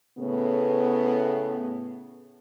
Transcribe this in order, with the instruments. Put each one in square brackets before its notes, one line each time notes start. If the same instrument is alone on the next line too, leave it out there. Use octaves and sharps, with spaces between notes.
[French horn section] A2 C#3 B3